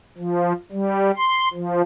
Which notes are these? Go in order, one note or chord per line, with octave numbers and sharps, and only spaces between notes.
F3
G3
C6
F3